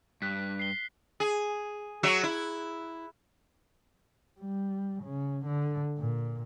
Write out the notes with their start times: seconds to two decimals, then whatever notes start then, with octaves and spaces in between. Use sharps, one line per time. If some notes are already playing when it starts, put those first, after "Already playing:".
0.22 G2 F#6 B6
0.59 C7 G7
1.20 G#4
2.03 F#3 F#4 E5
2.23 E4
4.40 G3
5.03 C#3
5.45 D3
5.98 A#2